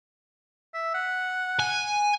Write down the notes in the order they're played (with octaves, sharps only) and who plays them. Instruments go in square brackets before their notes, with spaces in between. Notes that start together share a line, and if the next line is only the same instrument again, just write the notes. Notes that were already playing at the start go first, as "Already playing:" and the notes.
[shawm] E5
F#5
[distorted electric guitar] G#5